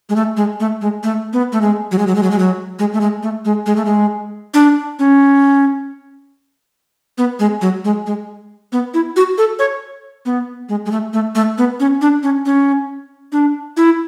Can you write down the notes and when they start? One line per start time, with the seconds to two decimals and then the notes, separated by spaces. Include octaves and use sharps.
0.09 G#3
0.16 A3
0.37 G#3
0.60 A3
0.81 G#3
1.03 A3
1.33 B3
1.52 A3
1.61 G#3
1.91 F#3
1.99 G#3
2.07 F#3
2.15 G#3
2.23 F#3
2.31 G#3
2.39 F#3
2.79 G#3
2.93 A3
3.01 G#3
3.23 A3
3.45 G#3
3.66 G#3
3.76 A3
3.85 G#3
4.54 D4
4.99 C#4
7.18 B3
7.39 G#3
7.61 F#3
7.85 G#3
8.07 G#3
8.72 B3
8.94 E4
9.16 F#4
9.38 A4
9.59 C#5
10.26 B3
10.69 G#3
10.86 G#3
10.91 A3
11.13 A3
11.35 A3
11.58 B3
11.80 C#4
12.01 D4
12.23 C#4
12.46 C#4
13.32 D4
13.77 E4